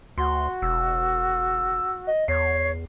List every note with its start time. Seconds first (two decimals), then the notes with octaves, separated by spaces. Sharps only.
0.18 D2 F#4 C6
0.62 E1 E6
2.07 D#5
2.28 E2 C#5 C7